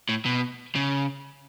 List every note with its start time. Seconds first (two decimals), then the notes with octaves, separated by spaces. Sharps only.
0.09 A2
0.25 B2
0.75 C#3